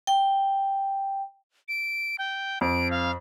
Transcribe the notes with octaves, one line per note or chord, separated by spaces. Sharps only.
G5
D7
G5
F2 D7
F5